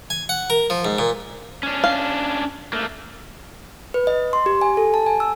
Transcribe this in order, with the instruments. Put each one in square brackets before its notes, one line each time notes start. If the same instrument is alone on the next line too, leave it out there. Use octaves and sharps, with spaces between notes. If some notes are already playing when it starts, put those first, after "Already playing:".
[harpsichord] G#5
F#5
A#4
F3
G#2
A#2
[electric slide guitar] C#4 D4
[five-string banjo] F5
[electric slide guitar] A3 A#3
[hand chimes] B4
D#5
C6
G4
G#5
A4
A5
G#5
E6